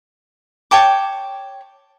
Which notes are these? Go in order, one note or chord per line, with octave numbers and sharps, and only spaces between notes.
C#5 G5 A5 D6